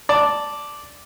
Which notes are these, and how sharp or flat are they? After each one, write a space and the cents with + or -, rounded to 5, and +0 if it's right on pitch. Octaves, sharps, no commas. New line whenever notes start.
D5 -5 A5 +0